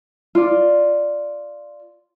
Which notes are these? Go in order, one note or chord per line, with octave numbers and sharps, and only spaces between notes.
F4 D5